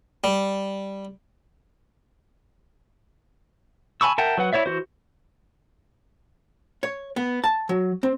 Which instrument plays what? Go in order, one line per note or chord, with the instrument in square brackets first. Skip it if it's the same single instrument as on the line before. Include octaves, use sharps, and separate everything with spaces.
[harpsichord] G3
[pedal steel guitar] G#5 A5 B5 C#6 E6
A#4 E5 F#5 G5 A5
F#3 B4 F#5
E4 C#5 D5 E5
E3 F#4 C5
[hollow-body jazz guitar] C#5
B3
A5
F#3
C4